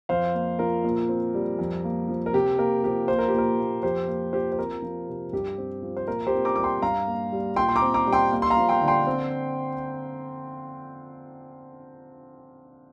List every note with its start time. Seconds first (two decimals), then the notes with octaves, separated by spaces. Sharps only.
0.09 F2 C5 F5
0.34 A#3
0.59 F3 A#4
0.84 A#2
1.09 C4
1.34 G3
1.59 F2
1.84 A#3
2.08 F3
2.26 A#4
2.33 C3 G4
2.58 A#3 A#4
2.84 F3 G4
3.08 A#3 C5
3.19 A#4
3.28 G4
3.34 A#2 A#4
3.58 A#3
3.83 F2 G4 C5
4.08 A#3
4.33 F3 G4 C5
4.52 C5
4.58 C4 A#4
4.82 F3
5.08 C3
5.33 G2 G4
5.58 C4
5.82 F3
5.97 C5
6.08 A#2 A#4
6.27 G4 C5
6.33 C4
6.45 A#5 D6
6.56 G3 D6
6.64 G5 C6
6.82 G2 F5 A#5
7.07 A#3
7.32 G3
7.56 A#2 G5 C6
7.69 C6
7.76 A#5 D6
7.82 C4
7.94 A#5 D6
8.07 G3
8.12 G5 C6
8.32 A#3
8.42 C6
8.50 F5 A#5
8.57 F3
8.69 G5 C6
8.81 D3
8.88 G5 C6
9.07 C4